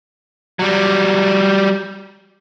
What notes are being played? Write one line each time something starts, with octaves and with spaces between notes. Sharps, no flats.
F#3 G3